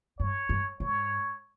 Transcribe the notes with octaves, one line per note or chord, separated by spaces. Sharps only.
G2 C#5
G2
G#2 C#5